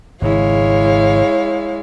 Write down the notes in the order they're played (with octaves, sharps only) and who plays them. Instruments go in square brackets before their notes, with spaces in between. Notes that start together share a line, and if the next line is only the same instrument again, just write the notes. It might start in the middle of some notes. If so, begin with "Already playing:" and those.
[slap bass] G#1 C#3 [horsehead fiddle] G#3 E4 [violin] C#5 F5